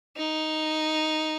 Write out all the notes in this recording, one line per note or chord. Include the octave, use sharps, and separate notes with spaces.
D#4